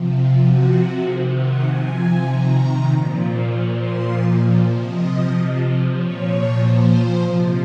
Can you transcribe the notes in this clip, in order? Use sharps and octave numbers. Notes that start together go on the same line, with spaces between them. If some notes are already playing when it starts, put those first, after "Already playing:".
Already playing: C3 F3
C3 F3 F#4
C3 D#3 G#4
F#5
C3 F3 G#5
C3 D#3 A#5
A#2 F3
A#2 F3 C#6
C6
A#2 F3 D#5
C3 F3 D#5
C3 F3
A#2 F3 C#5
A#2 F3 C5
C3 F3 D#5